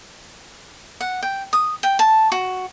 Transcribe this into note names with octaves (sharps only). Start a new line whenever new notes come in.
F#5
G5
D#6
G5
A5
F#4